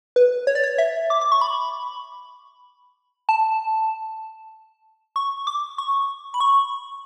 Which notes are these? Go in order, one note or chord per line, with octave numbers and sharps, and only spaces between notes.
B4
C#5
D5
C#5
E5
D6
D6
C#6
B5
A5
C#6
D6
C#6
B5
C#6